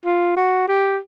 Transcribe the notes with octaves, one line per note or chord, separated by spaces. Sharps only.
F4
F#4
G4